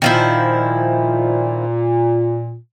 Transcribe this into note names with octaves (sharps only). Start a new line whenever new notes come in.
A#2 D#3 F3 E4